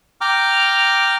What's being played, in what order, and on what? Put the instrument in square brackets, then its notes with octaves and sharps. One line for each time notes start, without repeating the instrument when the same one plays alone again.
[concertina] G5 A#5 D6 F6